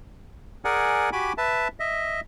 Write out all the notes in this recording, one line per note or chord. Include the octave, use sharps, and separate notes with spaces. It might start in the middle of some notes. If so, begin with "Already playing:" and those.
G#4 A#4 D5 F#5 G#5
F#4 G4 G#5 B5 D6
B4 E5 A5
D#5 E5